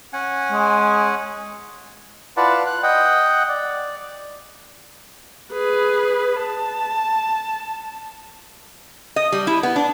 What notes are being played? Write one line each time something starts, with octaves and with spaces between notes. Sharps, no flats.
C#4 F#5 G#5
G#3
E4 F4 B4 D5 F#5 A5
F#6
D#5 F#5 G5
D5
G#4 B4
A5
D#5
G3
E4
B3
D4